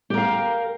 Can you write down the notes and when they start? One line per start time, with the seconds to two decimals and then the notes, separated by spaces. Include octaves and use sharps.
0.10 G4
0.14 A#4
0.17 F5